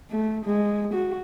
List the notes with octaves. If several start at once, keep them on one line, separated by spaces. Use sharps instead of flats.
A3
G#3
F#4